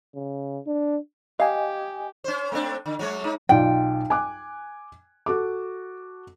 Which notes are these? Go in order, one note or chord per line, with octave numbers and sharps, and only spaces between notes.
C#3
D4
G4 D#5 F5 G#5
C#4 C5
A3 C4 D4
D3
F#3 G#3 C#5
G#3 D#4
B1 F4 D5 G5
G#5 D6 F#6
F#4 A4 D6